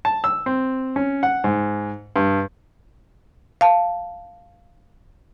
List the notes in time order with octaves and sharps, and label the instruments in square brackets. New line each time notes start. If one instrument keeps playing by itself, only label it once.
[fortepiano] A5
E6
C4
C#4
F#5
G#2
G2
[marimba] F5 A5